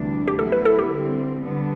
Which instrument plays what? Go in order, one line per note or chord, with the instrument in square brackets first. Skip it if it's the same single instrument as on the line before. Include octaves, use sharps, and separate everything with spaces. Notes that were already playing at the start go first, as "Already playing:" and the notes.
Already playing: [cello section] D2 C3 E3 G3 D4
[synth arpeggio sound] G4
[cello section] A2 F#3 B3 E4 [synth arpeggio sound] A4
[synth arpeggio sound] B4
A4
G4
[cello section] D3 G3 C4
D3 G3 B3 D4